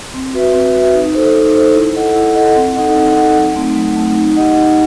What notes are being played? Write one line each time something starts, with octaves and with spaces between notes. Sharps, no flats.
C4
F#4 B4 E5
C4
F#4 B4 E5
D#4
A4 C5
D#4
A4 C5
E4
A4 D#5 F#5
E4
A4 D#5 F#5
C4
D#4 A4 D#5 F#5
C4
D#4 A4 D#5 F#5
F#3
A3 C4 D#4
F#3
A3 C4 D#4
D#4
G4 D#5 F#5
D#4